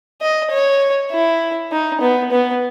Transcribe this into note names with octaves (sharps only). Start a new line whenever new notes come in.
D#5
C#5
E4
D#4
B3
B3